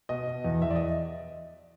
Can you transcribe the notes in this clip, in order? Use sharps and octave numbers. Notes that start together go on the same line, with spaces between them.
B2 D#5
B2
E2
E2 E5
D5
D#5